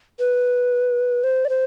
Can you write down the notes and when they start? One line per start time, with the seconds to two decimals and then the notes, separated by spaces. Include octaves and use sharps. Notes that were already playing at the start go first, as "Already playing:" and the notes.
0.20 B4
1.24 C5
1.45 D5
1.49 C5